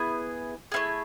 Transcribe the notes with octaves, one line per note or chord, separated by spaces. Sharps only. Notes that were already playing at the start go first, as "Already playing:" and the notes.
Already playing: B3 E4 G#4
A3 C4 E4 G#4